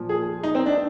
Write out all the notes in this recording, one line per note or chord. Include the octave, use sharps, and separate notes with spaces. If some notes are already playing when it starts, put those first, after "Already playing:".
Already playing: A#2 F3
G#4
D#4
C4
D4